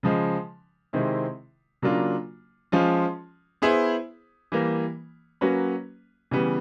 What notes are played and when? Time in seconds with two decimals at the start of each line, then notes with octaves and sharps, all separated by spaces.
0.03 C#3 F3 G#3
0.93 C3 D#3 G#3 C4 E4
1.82 C#3 F#3 A#3 D4 F4
2.72 F3 G#3 C#4 F4
3.62 B3 E4 G#4 C5
4.52 E3 G3 A#3
5.41 F#3 A#3 C#4 F#4 B4
6.31 C#3 E3 G3 B3